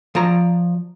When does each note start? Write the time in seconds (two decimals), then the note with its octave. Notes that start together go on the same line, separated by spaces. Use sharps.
0.15 F3 D5 A#5